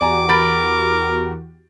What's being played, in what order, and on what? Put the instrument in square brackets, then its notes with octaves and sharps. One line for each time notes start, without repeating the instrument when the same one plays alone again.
[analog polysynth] E2 F#4 G4 [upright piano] D5 G#5 A#5 [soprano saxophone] D6
[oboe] A#4 [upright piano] B5 A6 D7